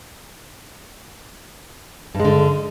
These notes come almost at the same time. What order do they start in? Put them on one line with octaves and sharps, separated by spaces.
G2 G#3 D3